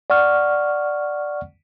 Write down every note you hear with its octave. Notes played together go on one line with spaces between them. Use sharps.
D5 F#5 C#6 F6